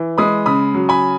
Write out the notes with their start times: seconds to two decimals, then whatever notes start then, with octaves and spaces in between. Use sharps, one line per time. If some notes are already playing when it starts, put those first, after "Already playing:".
Already playing: E3
0.18 G#3 B5 D#6
0.46 C#3 B5 D#6
0.74 F#3
0.89 G#5 B5